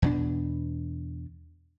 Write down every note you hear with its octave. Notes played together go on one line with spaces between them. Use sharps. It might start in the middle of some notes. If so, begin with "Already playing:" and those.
E2 B2 D4